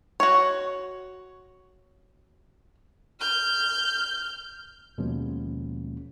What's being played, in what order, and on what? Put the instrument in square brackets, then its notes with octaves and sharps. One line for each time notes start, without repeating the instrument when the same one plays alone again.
[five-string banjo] F#4 C#5
[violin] F6 G6
[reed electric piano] D#2 B2 F3 G#3 A#3 C#4